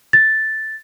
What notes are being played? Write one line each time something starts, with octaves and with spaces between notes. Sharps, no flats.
A6